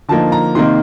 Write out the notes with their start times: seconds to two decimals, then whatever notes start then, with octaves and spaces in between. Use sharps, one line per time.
0.08 D3 F3 A#3 D#4 A5
0.32 A#5
0.55 C3 D#3 A#3 D#4 C6